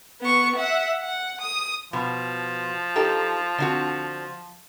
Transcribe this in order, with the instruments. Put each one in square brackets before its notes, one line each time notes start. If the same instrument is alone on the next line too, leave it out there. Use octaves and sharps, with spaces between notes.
[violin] B3 C#6
E5 F#5
F#5
D#6
[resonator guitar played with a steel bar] B2 [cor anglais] F3
[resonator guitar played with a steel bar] D#4 G4 A4
D3 C4 F#4